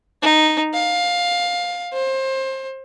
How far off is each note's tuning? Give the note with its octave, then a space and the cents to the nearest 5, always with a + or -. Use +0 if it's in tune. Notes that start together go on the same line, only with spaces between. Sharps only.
D#4 -5
F5 +15
C5 +25